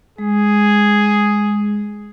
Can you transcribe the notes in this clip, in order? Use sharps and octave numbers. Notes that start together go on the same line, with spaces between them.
G#3 G#4